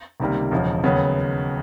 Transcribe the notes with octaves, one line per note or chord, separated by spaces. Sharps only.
C#2 C3 D#3 G3 A#3
E1 E2 C#3 F3
D#2 C#3 F#3 B3